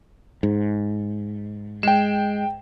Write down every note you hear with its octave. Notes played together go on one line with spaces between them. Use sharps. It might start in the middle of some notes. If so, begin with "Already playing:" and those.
G#2
G#3 G5 E7